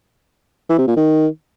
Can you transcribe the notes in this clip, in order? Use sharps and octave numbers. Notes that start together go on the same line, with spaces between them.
E3
C3
A#2
D#3